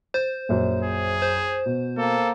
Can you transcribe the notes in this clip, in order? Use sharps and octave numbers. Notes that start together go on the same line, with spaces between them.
C5 A6
A#1 F#2
G#4
C5
B2
A#3 A4